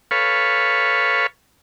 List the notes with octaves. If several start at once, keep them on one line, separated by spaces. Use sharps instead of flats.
A4 B4 C#5 F5 B5 C#6